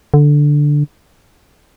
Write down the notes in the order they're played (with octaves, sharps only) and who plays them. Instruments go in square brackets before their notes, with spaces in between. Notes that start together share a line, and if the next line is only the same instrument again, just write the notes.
[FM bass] D3